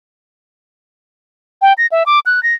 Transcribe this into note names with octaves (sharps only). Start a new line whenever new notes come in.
G5
A#6
E5
D6
F#6
A#6